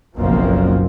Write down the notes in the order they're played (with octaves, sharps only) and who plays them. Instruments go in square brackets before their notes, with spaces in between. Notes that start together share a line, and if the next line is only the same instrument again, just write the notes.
[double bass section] F#1 B1 F#2 F3 A#3 C4